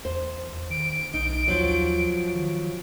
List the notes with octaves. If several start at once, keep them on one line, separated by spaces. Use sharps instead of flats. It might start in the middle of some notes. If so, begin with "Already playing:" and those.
E2 C5
D#3 D7
B1 D#4
D#2 F3 F#3
D#3